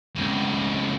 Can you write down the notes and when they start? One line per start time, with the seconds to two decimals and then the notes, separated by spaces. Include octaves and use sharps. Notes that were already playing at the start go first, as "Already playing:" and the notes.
0.16 C#2 A2